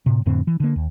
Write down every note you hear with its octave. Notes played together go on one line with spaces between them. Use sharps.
A2 C3
F2 A2 D3 C4
E3
D3 A#3
D#2